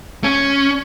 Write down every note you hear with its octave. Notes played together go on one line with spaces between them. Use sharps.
C#4